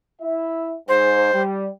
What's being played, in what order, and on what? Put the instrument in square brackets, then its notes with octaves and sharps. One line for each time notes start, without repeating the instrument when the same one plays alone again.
[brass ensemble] E4 E5
[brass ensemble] G#2 [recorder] C5
[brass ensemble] G3